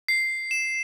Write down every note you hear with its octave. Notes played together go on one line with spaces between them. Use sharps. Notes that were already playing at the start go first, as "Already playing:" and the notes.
C7
E7